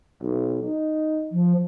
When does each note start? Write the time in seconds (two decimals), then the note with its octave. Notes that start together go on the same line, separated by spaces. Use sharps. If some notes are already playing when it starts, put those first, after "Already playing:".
0.22 B1
0.63 D#4
1.32 F3